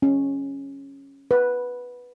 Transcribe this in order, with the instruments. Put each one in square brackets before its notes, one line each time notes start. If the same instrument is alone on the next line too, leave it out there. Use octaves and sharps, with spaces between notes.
[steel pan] C#4
B4